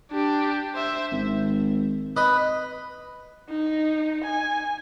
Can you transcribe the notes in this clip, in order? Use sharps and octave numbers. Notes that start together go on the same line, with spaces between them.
D4 G4
C5 E5
G#1
B4 D#5
D#4
G#5